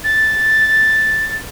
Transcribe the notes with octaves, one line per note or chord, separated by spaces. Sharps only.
A6